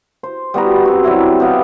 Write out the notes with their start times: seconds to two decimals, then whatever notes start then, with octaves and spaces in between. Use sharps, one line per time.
0.23 C5
0.54 G3 B3 F#4 A#5
0.71 F#4
0.85 F#2 C4 F#4
1.04 F#3 G3 E4
1.40 C3 B3 F5